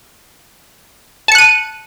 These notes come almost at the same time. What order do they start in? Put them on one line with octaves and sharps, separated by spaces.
A5 C#7 F#6 D#7